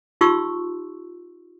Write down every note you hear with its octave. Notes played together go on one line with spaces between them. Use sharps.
D#4 F4 G4 C6 C#6 E6